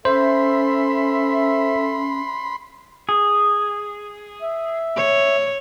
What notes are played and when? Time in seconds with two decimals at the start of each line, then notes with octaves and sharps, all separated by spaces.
0.05 C#4 A4 C5 E5 B5 C6
3.09 G#4
4.42 E5
4.96 C#5